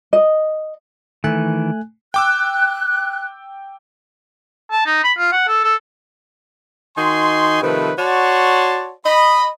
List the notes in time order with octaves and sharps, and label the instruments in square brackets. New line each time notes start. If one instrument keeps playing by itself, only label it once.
[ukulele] D#5
[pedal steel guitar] D#3 E3 [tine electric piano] A3 G#5 F#6
[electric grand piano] G5 D6 E6 [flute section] F#6
[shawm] A5
D#4
B5
F4
F#5
A4
A4
[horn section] D#3 D#4 F#4 G#5 C6
C3 D#3 F3 A3 B4
F#4 C#5 D5 F#5 A5 C6
D#5 B5